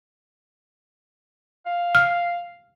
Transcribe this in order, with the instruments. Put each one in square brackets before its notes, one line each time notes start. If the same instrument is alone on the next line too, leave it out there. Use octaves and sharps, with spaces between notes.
[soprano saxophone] F5
[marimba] F6